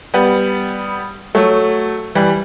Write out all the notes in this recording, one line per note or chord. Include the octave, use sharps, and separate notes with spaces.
G3 B3
F#3 A3
E3 G3